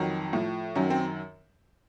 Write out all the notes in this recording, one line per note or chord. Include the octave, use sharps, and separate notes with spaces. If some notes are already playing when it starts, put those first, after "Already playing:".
Already playing: F2 D#3 F#3
A2 F3
F#2 D#3 F#3 C#4
C4